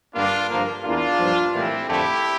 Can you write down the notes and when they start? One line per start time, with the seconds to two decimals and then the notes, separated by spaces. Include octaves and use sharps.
0.14 G2 D3 G3 A#3 D4 F4
0.50 G2 D3 F3 A#3
0.84 E2 E3 A#3 D4 F4
1.18 G2 F3 A#3
1.54 A2 E3 G3 A#3 C4 E4
1.88 F2 D3 F3 A3 E4 G4